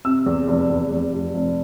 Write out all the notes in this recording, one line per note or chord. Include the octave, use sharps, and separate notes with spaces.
C3 E6
E2
F1
E2
F1
F1
F1